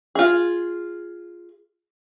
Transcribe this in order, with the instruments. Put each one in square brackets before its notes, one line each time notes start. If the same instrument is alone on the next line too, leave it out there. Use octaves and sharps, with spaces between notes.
[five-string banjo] F4 G#4